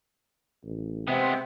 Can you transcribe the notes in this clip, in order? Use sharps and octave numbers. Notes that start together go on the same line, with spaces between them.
A1
C3 G#3 B3 C5 E5 G5